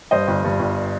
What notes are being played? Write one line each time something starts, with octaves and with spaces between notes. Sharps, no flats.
G2 C5 D#5
G1
G2
G1